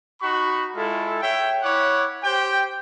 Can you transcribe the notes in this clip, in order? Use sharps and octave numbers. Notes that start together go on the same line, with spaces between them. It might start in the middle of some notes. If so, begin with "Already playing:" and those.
D#4 F#4 B5 C#6
G#3 E4 F4 A4
C#5 E5 G5
E4 C#5 F#5 D6
G4 C5 G5